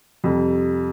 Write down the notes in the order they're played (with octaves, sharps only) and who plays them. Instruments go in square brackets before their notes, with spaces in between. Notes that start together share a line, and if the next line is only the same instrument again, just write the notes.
[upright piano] F2 C3 G3